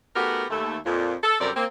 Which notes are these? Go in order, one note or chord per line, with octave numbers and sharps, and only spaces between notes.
A3 B3 D#4 F#4 G4 A#4
D#2 A3
F2 A#2
A4
F#2 C3 G3 A4 A#4 D5
A#3 C4